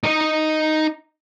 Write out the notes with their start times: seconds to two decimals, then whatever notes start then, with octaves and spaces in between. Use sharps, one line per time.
0.04 D#4 D#5